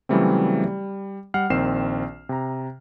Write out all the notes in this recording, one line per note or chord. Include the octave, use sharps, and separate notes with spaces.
C#3 E3 F#3 G3 A3 C4
G3
G3 F#5 F6 C7
A#1 D#3 C4 C7 E7
C3 A#5